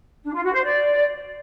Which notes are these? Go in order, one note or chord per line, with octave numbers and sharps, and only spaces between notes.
D4
F4
F#4
C5
D5